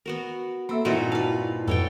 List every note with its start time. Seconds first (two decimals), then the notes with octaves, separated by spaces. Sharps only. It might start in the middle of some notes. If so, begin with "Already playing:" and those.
0.06 B3 F#4 A#4
0.69 A#3 C4 A4 E5 B5 E6
0.85 G2 A#2 C4 D#4 E4 F#4 A#4
1.12 B4 F5 A5
1.68 F2 G#2 B2 A4 B4 C#5 G5